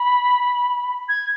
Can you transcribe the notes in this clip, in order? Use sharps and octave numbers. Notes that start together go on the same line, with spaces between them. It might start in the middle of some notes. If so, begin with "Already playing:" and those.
Already playing: B5
G#6